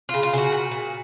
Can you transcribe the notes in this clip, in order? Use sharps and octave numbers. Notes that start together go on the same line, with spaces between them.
C#3 F4
F4
C#3 F#4
A#2
A#2